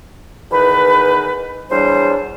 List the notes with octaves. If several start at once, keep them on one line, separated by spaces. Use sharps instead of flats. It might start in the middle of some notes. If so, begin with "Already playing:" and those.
E2 D#3 D#4 B4
E2 F#3 G3 D4 C5